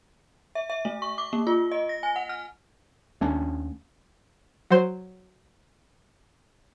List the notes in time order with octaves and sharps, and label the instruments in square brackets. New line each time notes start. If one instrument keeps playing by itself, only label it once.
[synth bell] E5
E5
A3
C#6
D6
A#3
F4
D#5
A#6
G#5
F#5
F6
[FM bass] D#2 [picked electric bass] A3 C#4 D4
[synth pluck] F#3 C5